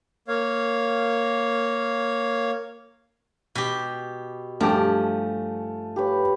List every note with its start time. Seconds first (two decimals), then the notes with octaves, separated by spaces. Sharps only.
0.28 A#3 C#5 F5
3.55 B2 G4
4.61 G2 F3 A3 G4 G#5
5.96 G4 B4 C#5